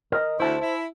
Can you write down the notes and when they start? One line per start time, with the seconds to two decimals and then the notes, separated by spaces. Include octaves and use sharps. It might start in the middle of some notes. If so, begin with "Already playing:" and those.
0.12 A#4 D#5
0.40 D2 E4 C5 A5
0.61 E4